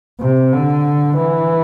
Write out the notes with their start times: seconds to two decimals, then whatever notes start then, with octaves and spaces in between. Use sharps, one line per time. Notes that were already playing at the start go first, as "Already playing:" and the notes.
0.20 C3
0.53 D3
1.17 E3